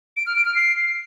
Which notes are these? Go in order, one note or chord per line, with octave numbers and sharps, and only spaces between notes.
D7
F6
D7
F6
C7